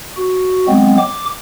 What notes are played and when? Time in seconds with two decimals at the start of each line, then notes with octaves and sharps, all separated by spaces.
0.17 F#4
0.68 F#3 G#3 B3 C4
0.98 D6